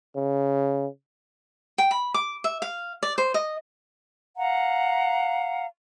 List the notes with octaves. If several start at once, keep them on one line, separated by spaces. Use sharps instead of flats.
C#3
G5
B5
D6
E5
F5
D5
C5
D#5
F5 F#5 A#5